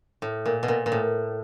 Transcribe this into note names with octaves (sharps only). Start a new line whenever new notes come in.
A2
A#2
B2
A#2
A#2
A2